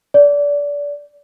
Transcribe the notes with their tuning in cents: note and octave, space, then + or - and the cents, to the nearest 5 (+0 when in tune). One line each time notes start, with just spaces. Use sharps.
D5 -25